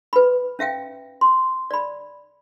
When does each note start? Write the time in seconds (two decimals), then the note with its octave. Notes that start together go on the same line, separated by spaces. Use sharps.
0.13 B4 B5
0.59 C#4 E5 F5 G5
1.21 C6
1.71 D5 B5